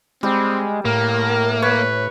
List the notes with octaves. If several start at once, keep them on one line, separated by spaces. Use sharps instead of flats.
G3 G#3 C4
A2 A#3 A#4
B4 C#5